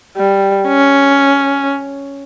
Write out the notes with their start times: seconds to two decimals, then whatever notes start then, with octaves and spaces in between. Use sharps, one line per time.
0.17 G3
0.68 C#4